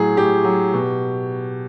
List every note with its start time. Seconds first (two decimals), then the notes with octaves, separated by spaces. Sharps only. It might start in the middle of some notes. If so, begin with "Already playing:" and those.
Already playing: A2 F#3 G#4
0.17 A2 G4
0.44 F#3
0.74 B2